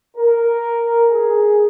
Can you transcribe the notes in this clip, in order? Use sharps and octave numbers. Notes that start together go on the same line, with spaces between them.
A#4
G#4